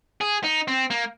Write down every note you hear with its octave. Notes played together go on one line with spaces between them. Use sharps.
G#4
D#4
C4
A#3